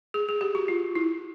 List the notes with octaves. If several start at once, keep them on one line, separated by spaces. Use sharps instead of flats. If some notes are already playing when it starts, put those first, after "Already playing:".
G#4
G#4
G4
F#4
F4
E4